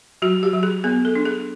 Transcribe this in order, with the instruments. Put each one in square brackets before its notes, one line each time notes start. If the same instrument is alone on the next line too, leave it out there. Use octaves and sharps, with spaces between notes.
[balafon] F#3 F#4
G4
F#3
G#4
B3 G#4
A4
D4
G#4